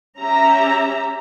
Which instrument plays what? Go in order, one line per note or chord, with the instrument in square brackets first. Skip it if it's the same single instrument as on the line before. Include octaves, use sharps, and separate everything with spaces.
[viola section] C#4 G4 E5 A#5